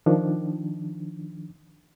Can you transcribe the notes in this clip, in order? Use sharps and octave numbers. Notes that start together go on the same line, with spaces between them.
D#3 F3 D4